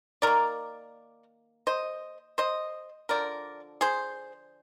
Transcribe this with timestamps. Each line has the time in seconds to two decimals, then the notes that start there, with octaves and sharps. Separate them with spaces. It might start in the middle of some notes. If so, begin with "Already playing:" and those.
0.22 D#3 A#3 A#4 D5
1.67 C5 D#5
2.38 C5 D#5
3.09 D3 F3 A#4 D5
3.81 G#4 C5